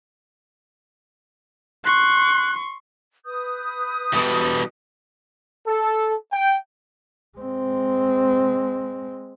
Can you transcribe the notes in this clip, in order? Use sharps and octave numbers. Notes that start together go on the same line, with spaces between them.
C6 C#6 F#6
B4 D#6 G6
B2 E3 G3 A4
A4
G5
G#3 C4